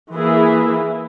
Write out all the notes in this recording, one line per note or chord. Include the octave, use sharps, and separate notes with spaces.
E3 A#3 E4 G#4